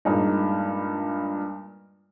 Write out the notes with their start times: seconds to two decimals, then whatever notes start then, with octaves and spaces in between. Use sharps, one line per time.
0.05 G2 A#2 G#3 D#4